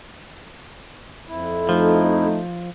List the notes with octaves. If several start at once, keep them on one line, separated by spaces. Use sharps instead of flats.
F2 E4
F3 A3 D#4